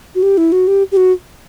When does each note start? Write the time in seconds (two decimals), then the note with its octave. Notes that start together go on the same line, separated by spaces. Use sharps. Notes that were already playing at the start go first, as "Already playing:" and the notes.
0.15 F#4
0.23 G4
0.38 E4
0.52 F#4
0.67 G4
0.92 G4
0.97 F#4